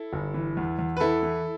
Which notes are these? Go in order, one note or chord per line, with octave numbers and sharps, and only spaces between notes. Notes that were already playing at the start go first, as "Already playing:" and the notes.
Already playing: E4 A4
G1
E3
E2
E2
B4
E3 E4 A4
E3